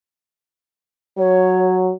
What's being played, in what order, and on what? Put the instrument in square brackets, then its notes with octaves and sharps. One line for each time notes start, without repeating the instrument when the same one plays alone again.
[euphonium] F#3 [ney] C#5